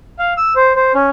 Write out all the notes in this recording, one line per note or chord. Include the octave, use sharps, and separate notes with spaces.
F5
E6
C5
C5
C#4